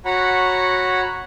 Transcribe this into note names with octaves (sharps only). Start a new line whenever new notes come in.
F#4 C#5 F#5 A#5 B5